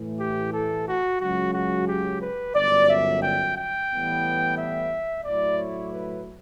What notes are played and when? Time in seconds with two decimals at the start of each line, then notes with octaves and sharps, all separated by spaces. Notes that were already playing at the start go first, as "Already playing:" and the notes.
Already playing: A2 E3 A3
0.20 G4
0.54 A4
0.87 F#4
1.21 C#2 C#3 F#3 F#4
1.54 F#4
1.88 G4
2.22 B4
2.56 G1 F#2 D3 D5
2.89 E5
3.23 G5
3.57 G5
3.90 A2 E3 G3 B3
4.58 E5
5.25 A2 F#3 A3 E4 D5
5.58 C#5
5.92 B4